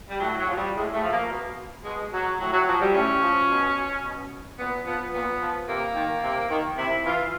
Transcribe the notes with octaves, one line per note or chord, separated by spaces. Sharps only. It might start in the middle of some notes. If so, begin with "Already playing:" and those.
G3
A2 F#3
F#3
F3
G3
A2 G#3
A3
F3
A#3
B2
B2 G#3
F#3
A2 F#3
F#3
F3 F#3
G3
A2 C#4
F3
B2
B2
A#2 B3
F3 B3
A#2 B3
F3
C3 A#3
D#3
C3
D#3
C3 E4
E3 F4